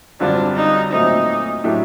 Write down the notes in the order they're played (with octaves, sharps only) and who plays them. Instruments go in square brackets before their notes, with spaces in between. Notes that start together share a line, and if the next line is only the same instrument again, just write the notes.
[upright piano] F#2 D3 G3 C4 F4 [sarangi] D4
[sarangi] D#4
[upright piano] A#2 F#3 A3 C4 [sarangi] D#4
[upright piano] A2 F#3 A3 D4 G4